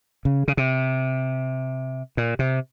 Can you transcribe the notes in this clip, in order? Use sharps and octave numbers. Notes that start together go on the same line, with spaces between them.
C#3
C#3
C3
A#2
C3